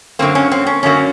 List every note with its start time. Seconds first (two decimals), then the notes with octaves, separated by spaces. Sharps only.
0.19 F#2 D3 F#3 A#3 C4
0.35 C#4
0.52 C4
0.67 C#4
0.83 F#2 D3 F#3 A#3 C#4